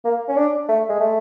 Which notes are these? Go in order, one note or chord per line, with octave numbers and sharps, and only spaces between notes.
A#3
C#4
D4
A3
G#3
A3